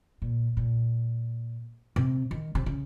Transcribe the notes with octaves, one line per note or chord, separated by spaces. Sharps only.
A#2
A#2
C3
D#3
C3
C#3